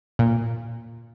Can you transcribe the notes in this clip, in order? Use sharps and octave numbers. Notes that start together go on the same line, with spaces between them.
A#2